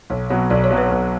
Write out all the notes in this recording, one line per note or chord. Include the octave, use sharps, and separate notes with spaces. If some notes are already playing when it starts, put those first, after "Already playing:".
B1 C#5
B2 F#3 C#5
B1 D5
C#5
B2 F#3
B4
C#5
B1 B4